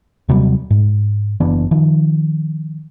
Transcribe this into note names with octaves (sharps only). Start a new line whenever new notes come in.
D#2 C3 F#3 G3
G#2
F#1 E3 B3 D4
D#3 F3